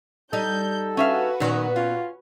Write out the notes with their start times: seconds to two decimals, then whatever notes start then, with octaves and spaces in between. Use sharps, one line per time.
0.33 G3 D#4 A4 D#5 G6
0.97 C#4 F#4 B4 E5 F5
1.40 A#2 D#3 F#3 B3 C#4
1.76 C#4 F4